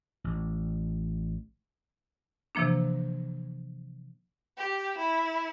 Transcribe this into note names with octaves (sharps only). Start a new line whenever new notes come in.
A1
C3 E3 F3 A#3 D4
G4
E4 E7